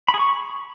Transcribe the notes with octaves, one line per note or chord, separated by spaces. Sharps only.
B5
G#4
C#6